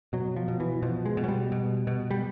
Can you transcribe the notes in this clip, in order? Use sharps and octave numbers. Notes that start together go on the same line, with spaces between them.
B2 F#3
F3
B2
E3
B2 F3
G#3
B2
F#3
G3
B2
B2
G3